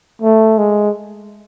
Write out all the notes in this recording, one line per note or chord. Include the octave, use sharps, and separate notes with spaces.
A3
G#3